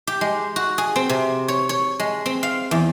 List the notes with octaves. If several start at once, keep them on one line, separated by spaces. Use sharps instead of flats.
G4
G#3
F#4
G#4
C4
C3
C#5
C#5
G#3
C4
F5
E2